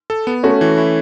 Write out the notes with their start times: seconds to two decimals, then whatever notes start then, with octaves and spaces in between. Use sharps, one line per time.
0.10 A4
0.27 B3
0.43 A3 C#4 F#4
0.61 E3
0.78 E4